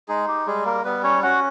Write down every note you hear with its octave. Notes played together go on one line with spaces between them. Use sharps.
G#3 D#4 G#4
G4
G3 G#3 G#4
A#3 A#4
G3 B3 B4
C#4 C#5
C#4 F#4 F#5